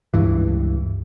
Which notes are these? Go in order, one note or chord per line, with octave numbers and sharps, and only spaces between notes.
C#2 G2 E3